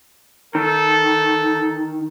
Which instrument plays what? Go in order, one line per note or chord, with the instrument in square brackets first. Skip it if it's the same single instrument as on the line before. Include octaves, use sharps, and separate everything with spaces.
[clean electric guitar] D#3 [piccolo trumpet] A4